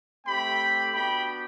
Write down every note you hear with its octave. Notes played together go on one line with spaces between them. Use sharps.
A3 C4 G4 G5 B5
B3 D4 F#4 G5 B5